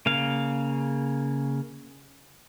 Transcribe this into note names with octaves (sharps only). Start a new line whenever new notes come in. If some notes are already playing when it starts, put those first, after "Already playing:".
C#3 A#3 F5